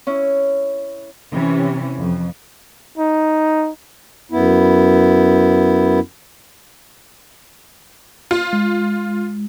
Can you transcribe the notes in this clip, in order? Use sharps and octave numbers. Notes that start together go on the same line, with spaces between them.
C#4 E4
C3 E3 C#4
F2
D#4
F#2 B3 E4
F4
G#3